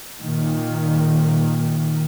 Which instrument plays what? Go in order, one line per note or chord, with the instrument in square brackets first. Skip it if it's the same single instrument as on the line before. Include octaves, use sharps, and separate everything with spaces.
[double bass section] A#2 D#3